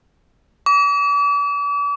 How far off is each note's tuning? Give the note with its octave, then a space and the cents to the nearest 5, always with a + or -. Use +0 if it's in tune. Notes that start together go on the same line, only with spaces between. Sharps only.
D6 -40